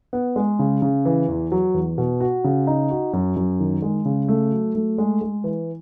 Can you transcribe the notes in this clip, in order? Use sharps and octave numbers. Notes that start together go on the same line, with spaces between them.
B3
G#3
C#3
C#3
E3
E2
F#3
E2
B2
F#4
C#3
D#4
F#4
F#2
F#2
D#3
G#3
C#3
A3
F#3
A3
G#3
G#3
E3